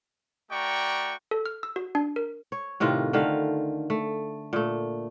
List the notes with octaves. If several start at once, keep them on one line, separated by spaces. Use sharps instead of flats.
A3 F#4 D5 G5 A#5 C#6
A4
F6
E6
F#4
D4
A#4
C#5
A2 C3 D#3 F4
D3 D#3 A3 F5
A3
A#2 A3